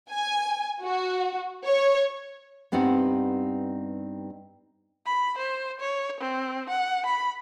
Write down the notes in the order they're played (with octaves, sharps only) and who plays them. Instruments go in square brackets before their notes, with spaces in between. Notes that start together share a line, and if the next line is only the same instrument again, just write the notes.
[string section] G#5
F#4
C#5
[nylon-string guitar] G2 B3 C4 D#4 G4 F#5
[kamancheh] B5
C5
C#5
C4
F#5
B5